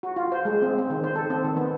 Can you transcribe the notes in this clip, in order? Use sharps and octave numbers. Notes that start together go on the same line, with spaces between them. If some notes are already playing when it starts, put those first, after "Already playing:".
F#4
F4
C5
G#3
C4
C4
D#3
C5
A4
C4
D#3
B3